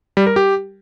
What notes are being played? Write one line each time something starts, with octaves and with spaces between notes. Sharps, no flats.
G3
A#4
G4